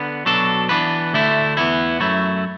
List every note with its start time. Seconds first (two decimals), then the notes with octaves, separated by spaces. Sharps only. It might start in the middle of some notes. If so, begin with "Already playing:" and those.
Already playing: D3 B3
0.26 B2 F#3 D4 A4
0.69 E3 B3 D4 B4
1.14 D2 D3 A3 E4
1.57 E2 E3 B3 E4
2.00 F#2 F#3 A3 E4